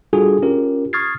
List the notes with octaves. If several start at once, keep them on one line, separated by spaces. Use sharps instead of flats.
G3 D4 F4 F#4 G#4 A4
C#4 F4 G4 A#4
C#6 D#6 F6 G#6 A6 C7